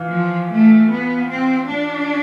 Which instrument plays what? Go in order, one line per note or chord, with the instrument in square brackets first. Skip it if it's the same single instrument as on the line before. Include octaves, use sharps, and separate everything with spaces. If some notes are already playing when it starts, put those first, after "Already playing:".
Already playing: [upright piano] E3 F4
[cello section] F3
A3
B3
C4
D4